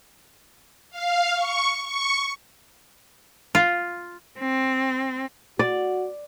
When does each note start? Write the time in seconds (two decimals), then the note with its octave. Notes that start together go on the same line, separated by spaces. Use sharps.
0.90 F5
1.35 C#6
1.85 C#6
3.55 F4
4.39 C4
5.59 F#4 D5